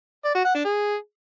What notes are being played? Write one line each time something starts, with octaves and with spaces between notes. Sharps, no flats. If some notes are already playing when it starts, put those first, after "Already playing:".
D5
F#4
F#5
D4
G#4